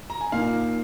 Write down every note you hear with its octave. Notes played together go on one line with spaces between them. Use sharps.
A#5
G#5
A#2 A#3 D#4 F5